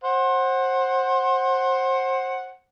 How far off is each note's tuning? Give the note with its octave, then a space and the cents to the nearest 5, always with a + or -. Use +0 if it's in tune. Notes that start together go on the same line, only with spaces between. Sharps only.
C5 +25 F#5 +0